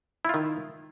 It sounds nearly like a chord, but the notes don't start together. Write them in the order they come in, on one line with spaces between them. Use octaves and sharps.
E4 F4 D#3